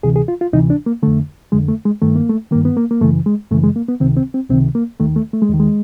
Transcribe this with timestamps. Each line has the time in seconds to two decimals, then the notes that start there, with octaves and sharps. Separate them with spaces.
0.03 D2 C3 E3 G#4
0.16 G#4
0.28 F4
0.41 F4
0.53 D2 C3 E3 D#4
0.70 D4
0.86 A#3
1.03 F2 D3 A3
1.52 F2 D3 G#3
1.68 A3
1.85 G#3
2.02 G2 D#3 A3
2.16 A#3
2.29 A3
2.51 D#3 A#3
2.55 G2
2.65 B3
2.77 A#3
2.91 A#3
3.01 F#2 C#3 E3 A3
3.26 G#3
3.51 F#2 C#3 E3 A3
3.64 G#3
3.76 A#3
3.89 B3
4.00 C#2 C3 D#3 C4
4.17 C4
4.34 C4
4.49 C#2 C3 D#3 C4
4.75 A#3
5.00 D#2 D#3 A3
5.16 A3
5.33 A3
5.42 G#3
5.49 D#2 D#3
5.60 G#3